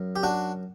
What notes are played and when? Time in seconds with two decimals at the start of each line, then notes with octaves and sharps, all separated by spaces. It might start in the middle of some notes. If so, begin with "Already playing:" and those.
Already playing: F#2
0.16 G4
0.23 D4 F#4